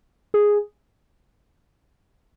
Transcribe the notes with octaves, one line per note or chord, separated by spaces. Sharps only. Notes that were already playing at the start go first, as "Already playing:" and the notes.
G#4